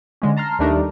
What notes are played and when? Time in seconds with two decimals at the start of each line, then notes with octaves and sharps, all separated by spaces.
0.22 D3 G#3 C#4
0.36 A5 A#5 C6 F6
0.59 D#2 G3 A3 D4 D#4 A#4